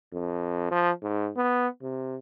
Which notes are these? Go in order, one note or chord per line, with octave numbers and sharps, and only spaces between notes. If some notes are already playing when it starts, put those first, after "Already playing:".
F2
F3
G#2
B3
C3